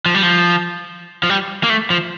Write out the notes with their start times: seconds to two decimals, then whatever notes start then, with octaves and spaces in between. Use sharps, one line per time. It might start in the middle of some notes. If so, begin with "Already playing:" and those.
0.06 F3
0.15 G3
0.23 F3
1.23 F3
1.30 G3
1.63 A#3
1.70 A3
1.90 F3